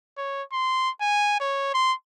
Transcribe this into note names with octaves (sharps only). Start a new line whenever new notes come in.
C#5
C6
G#5
C#5
C6